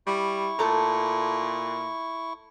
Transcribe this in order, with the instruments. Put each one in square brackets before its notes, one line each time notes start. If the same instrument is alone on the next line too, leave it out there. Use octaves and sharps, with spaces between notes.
[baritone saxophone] G3 [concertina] E4 C#6
[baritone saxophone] A#2 [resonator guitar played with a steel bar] A3 A4 A#5